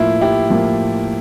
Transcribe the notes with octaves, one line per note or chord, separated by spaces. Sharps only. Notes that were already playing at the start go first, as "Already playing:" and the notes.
Already playing: A2 F3 A#3 E4 F4
E4 G4
A2 F3 A#3